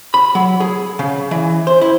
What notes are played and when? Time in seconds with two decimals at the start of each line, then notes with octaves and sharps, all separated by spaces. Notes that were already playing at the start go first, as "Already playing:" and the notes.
0.14 B5
0.35 F#3
0.60 G#4
0.99 C#3
1.31 E3
1.67 C5
1.81 E4